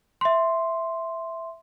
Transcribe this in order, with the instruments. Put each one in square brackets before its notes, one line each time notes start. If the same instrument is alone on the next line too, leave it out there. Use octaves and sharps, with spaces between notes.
[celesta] E5 C6